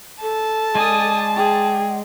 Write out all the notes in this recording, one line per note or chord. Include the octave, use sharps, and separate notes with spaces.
A4 A5
G#3 D5 G#5 D#6
G#4 G5